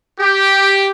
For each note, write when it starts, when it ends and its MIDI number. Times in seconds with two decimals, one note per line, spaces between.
0.19 0.90 67